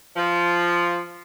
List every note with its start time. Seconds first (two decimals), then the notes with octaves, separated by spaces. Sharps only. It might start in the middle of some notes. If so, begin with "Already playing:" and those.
0.17 F3